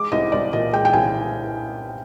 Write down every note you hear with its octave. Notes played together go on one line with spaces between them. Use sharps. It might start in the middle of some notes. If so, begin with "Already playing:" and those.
Already playing: G#3 D6
C2 D#5
C2 D5
A#2 D#5
G#3 G5
G5
C2 G#5